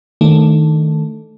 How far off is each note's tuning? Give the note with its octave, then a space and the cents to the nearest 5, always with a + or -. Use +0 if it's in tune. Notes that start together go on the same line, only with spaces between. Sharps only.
D#3 +0 A3 +0 D4 +0